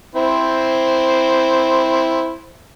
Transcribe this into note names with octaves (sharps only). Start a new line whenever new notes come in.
C4 E4 C5